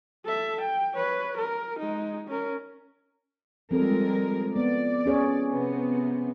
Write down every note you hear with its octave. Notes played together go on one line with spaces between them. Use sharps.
A4 E5
G5
B4 C#5
A#4
G#3 D#4
C#4 A#4
F3 G3 G#3 C4 A4 A#4
B3 D5
C#4 G#4 C#5
C3 B3